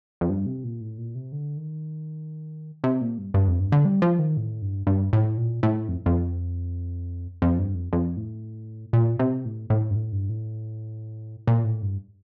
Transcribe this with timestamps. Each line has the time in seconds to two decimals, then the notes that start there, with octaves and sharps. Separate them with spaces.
0.21 F2
0.30 G2
0.46 C3
0.64 A#2
0.81 A2
0.98 A#2
1.15 C3
1.32 D3
1.57 D#3
2.84 C3
3.01 A#2
3.18 G2
3.34 G2
3.47 F2
3.60 G2
3.72 D3
3.85 G3
4.02 F3
4.19 D#3
4.37 A2
4.62 G2
4.87 G2
5.13 A2
5.37 A#2
5.63 A2
5.88 F2
6.06 F2
7.42 F2
7.59 G2
7.75 F2
7.93 F2
8.17 A2
8.93 A#2
9.19 C3
9.45 A2
9.70 A2
9.90 G2
9.96 A2
10.12 G2
10.29 A2
11.47 A#2
11.64 A2
11.82 G2